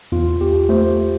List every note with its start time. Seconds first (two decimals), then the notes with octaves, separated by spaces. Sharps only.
0.12 E2 F4
0.41 E2 G4
0.69 A3 C5